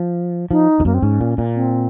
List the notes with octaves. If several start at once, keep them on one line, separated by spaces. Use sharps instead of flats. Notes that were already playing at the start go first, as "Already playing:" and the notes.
Already playing: F3
F3 D#4
F2
F#2 A#3
C4
G#2 C#4
A#2
A#2
C4